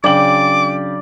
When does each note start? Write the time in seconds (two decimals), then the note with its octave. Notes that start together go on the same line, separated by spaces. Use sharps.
0.04 C#3 F#3 D4 D5 G5 D6 F#7